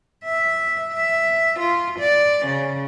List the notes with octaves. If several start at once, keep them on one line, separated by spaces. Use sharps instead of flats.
E5
E5
F4
D5
C#3